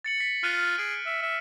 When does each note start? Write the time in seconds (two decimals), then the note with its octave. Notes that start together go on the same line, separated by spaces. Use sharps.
0.05 A6 C#7 F#7
0.18 A6 B6
0.43 F4 F6 F#6 D#7
0.78 G#4 D7
1.06 E5
1.22 E5